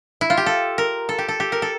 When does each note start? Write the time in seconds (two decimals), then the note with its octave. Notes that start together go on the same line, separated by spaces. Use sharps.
0.21 E4
0.30 F4
0.37 G4
0.46 A4
0.78 A#4
1.09 A4
1.18 G4
1.28 A4
1.40 G4
1.52 A#4
1.62 A4